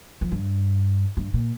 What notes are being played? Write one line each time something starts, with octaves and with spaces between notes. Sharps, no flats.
F2
G2
G2
A#2